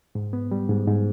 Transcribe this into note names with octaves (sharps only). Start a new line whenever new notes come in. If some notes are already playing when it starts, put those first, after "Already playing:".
G#2
B3
G3
G#2
G#2